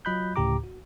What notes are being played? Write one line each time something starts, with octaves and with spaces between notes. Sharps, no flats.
F#3 F4 D#5 B5 F#6 G6
D2 A2 C#3 G4 A#5 D6
F#4